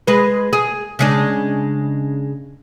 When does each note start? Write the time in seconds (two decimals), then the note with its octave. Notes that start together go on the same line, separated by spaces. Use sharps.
0.07 G#3 B4
0.53 G#4
0.99 C#3 G#3 D4